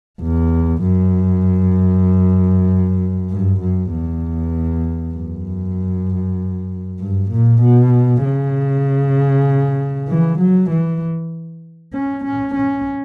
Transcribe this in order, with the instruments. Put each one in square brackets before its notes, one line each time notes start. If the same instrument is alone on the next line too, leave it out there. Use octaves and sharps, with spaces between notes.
[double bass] E2
F#2
G2
F#2
E2
F#2
G2
A#2
B2
C#3
E3
F#3
E3
C#4
C#4
C#4